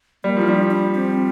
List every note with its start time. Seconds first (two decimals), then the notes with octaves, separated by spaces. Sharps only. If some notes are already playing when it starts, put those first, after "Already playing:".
0.24 G3 A#3
0.37 F3 E4
0.48 G3 D4
0.71 D4
0.95 C4